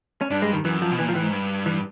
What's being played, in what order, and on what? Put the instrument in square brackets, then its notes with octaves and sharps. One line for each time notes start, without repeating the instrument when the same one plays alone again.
[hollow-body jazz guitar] C#4
[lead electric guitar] G2 [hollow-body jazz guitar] D4
[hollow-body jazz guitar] G#3
D#3
[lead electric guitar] F#2 [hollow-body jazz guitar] E3
[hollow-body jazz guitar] F3
[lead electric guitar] B2
[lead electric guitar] A#2 [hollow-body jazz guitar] E3
[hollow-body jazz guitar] F3
[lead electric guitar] A2 [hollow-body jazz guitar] E3
[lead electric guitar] G#2
G2
[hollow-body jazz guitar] E3